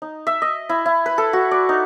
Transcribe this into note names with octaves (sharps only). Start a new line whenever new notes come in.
D#4
E5
D#5
E4
E4
B4
A4
F#4
D5
D#4